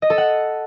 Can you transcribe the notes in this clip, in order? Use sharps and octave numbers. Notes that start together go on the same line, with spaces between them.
D#5
A4
F#5